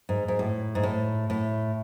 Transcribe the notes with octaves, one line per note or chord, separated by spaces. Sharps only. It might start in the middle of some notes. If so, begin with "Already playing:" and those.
G#2
G#2
A2
G#2
A2
A2